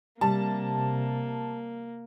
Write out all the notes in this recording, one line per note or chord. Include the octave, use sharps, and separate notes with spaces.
C3 G3 A#3 A5